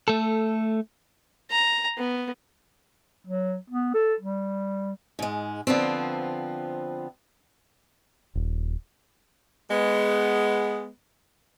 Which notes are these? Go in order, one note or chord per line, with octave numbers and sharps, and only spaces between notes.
A3 A4
A#5
B3
F#3
B3
A4
G3
G#2 G#3
D3 F3 B3 C4
D#1
G#3 B3